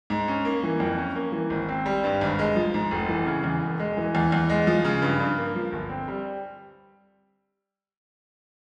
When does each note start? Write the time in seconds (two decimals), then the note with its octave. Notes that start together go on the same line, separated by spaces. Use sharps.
0.10 G#2
0.28 C#4
0.45 A#3
0.63 E3
0.80 F2
0.98 C#4
1.16 A#3
1.32 E3
1.50 G#1
1.68 C4
1.86 G3
2.04 G2
2.21 G#1
2.39 G#3
2.56 F3
2.74 G#2
2.91 F1
3.09 E3
3.26 C#3
3.44 E2
3.61 E1
3.79 G#3
3.97 E3
4.15 E2
4.32 E2
4.49 G#3
4.67 F3
4.84 C#3
5.02 G2
5.20 G2
5.38 A#3
5.55 F3
5.72 G1
5.89 C4
6.08 G3